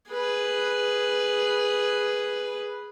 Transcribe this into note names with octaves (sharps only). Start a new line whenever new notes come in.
G#4 B4